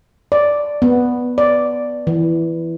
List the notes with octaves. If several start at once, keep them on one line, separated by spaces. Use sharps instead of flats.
D5
B3
D5
E3